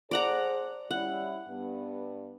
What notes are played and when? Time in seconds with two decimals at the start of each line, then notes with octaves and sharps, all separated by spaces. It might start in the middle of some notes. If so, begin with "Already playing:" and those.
0.11 G#4 A4 C5 D5 F#5 A#5
0.91 G3 C#4 E4 F#5
1.49 G2 B3